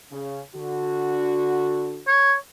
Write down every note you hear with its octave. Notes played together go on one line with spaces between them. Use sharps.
C#3
D3 F#4
C#5